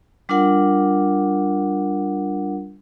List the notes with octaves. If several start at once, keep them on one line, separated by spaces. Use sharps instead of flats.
G3 D4 F4 A#4 F#5